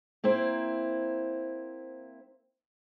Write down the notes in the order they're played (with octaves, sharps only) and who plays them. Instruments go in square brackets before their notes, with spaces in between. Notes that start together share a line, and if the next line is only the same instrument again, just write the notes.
[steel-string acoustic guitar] A#3 C4 E4 C5